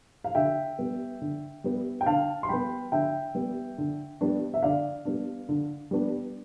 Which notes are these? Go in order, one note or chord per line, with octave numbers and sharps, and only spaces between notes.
F5
D3 E5 G5
G3 B3
D3
G3 B3
G5
D3 F5 A5
C6
G3 B3 G5 B5
D3 E5 G5
G3 B3
D3
G3 B3 D4
E5
D3 D5 F5
G3 B3 D4
D3
G3 B3 D4